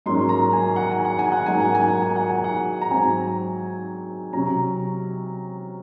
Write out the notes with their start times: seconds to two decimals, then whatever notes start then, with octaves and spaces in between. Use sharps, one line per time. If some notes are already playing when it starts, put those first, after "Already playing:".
0.06 G#2 F#3 A#3 C#4 C6
0.29 A#5
0.53 G#5
0.76 F#5
0.91 G#5
1.05 F#5
1.19 G#5
1.32 F#5
1.46 G#2 F#3 A#3 G#5
1.60 F#5
1.75 G#5
1.88 F#5
2.02 G#5
2.16 F#5
2.30 G#5
2.44 F#5
2.81 A#5
2.90 G#2 F#3 C4 G#5
4.32 C3 F#3 C#4 A#5